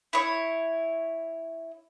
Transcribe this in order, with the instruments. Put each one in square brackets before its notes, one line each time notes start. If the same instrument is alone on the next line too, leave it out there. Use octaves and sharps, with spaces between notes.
[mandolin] E4 C#5